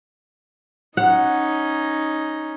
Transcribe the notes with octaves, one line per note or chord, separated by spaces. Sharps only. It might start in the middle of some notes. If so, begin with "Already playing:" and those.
C#4 D#4 F#5